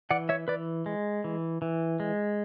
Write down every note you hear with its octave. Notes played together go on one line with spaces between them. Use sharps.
E3 D5 F#5
C#5 E5
E3 B4 D5
G#3
E3
E3
G#3